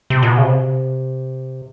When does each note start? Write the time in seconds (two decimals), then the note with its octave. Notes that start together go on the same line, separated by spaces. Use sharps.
0.10 C3
0.22 A#2
0.27 B2
0.38 C#3
0.43 C3